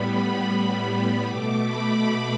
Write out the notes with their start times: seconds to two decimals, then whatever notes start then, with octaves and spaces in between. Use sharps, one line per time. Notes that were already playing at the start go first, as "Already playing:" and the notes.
Already playing: A2 G3 B3 B5
0.11 B5
1.26 B2 A3 D6
1.64 B5